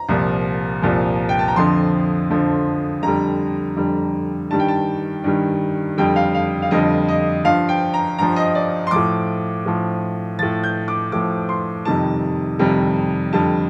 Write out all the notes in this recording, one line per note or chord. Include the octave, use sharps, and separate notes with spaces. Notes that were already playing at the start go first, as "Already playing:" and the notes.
Already playing: A#5
C2 A#2 F3
C2 A#2 F3
G5
A5
A#5
F2 D3 F3 C6
F2 D3 F3
F2 D3 G3 A#5
F2 D3 G3
G2 D#3 G3 A5
G5
A5
G2 D#3 G3
F2 D3 G3 G5
F5
F5
F5
F2 D3 G3 D#5
D#5
G2 F3 F5
G5
A#5
G2 F3 A#5
D#5
D5
C6
A2 F3 D6
A2 F3
A2 F3 A6
G6
D6
A2 F3 D6
C6
F2 C3 D#3 G3 A5
F2 C3 D#3 G3
F2 D3 G3 A5